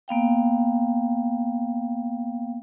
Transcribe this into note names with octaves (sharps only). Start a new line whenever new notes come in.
A#3 B3 F5 G5